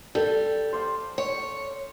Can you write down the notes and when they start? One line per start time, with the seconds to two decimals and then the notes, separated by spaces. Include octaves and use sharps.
0.15 G3 A4
0.73 C5 D5 F5
1.18 C#5